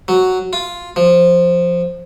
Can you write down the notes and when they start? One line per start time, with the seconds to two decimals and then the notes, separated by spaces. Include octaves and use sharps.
0.08 F#3
0.53 F4
0.96 F3